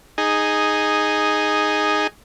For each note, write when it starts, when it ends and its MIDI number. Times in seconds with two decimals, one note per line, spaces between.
0.18 2.07 63
0.18 2.07 68